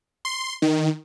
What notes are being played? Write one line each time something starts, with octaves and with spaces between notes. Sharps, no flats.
C6
D#3